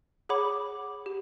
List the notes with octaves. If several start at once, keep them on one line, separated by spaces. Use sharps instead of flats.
G#4 C#5 F#5 B5 D6
G4